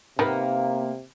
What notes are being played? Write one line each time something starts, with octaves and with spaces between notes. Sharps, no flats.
C3 D#3 A#3 B3 A#4 B4